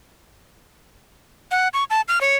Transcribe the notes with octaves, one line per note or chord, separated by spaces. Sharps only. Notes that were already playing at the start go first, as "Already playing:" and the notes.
F#5
C#6
A5
F6
C#5